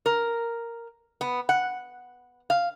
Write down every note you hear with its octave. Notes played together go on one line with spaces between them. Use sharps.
A#4
B3
F#5
F5